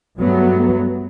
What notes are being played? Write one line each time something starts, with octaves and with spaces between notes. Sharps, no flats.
G2 F#3 A3 B3